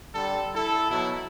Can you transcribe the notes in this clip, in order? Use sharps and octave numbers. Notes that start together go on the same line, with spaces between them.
D3 G3 A4
E4 A4
B2 F#3 E4